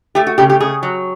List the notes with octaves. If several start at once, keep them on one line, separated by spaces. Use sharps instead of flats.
A3 G4
F#4
C#3 G4
G4
C#3 G#4
F#3